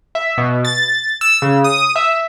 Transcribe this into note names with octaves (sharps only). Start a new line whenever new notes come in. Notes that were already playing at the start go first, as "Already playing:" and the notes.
E5
B2
A6
E6
C#3
D#6
E5